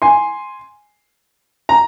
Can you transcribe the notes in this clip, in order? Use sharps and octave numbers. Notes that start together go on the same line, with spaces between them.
G#5 C6
A#5